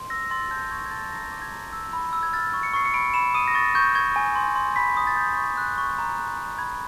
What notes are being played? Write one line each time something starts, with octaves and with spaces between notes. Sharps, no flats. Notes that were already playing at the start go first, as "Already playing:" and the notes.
Already playing: C6
E6 A#6
C6 A6
A5 G6
C#6 G#6
G#6
A5 A6
A#5 A#6
D6
G#6
A#5
E6
B5
E6
G#6
F6 A6
C#6
C#7
C#6 C7
C#7
B5 D7
B5 E7
D#6 D#7
A#6
C#6 A6
C#6 G6
C#6 G#6
G#5
C6
C6
B5 B6
D#6
A6
G6
C#6
F#6
C#6
A#5
F#6
A#5
B5 G#6